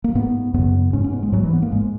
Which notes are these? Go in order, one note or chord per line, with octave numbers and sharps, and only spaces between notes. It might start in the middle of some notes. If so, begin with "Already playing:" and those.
A#3
G#2 B3
F#2 C#3 B3
G#2 C#4
C#4
B3
G#3
G#2 F#3
E3
B3
A#3
G#2 G#3